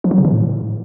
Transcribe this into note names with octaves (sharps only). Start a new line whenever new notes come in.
F3
F#3
C#3
E3
A2